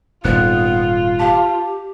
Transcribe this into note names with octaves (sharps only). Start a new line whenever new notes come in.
D#1 G#2 B3 F4 F#6
G4 F5 A5